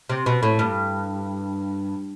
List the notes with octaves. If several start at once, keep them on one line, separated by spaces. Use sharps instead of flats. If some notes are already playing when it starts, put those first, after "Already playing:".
C3
B2
A2
G2